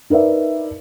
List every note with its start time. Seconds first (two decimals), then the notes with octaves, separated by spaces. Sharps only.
0.10 D#4 A#4 B4 D5 E5